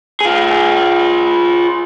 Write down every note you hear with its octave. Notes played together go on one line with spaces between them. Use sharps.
F4 G#4